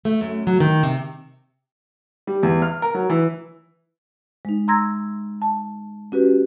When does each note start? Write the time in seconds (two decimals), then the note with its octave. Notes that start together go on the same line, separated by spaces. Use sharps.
0.05 A3
0.21 F#2
0.47 F#3
0.60 D#3
0.83 C3
2.27 G3
2.43 E2
2.62 F6
2.82 A#4
2.94 F#3
3.09 E3
4.45 G#3 D#4
4.68 A#5 C6 E6 G#6 A#6
5.42 A5
6.12 C#4 F#4 G4 B4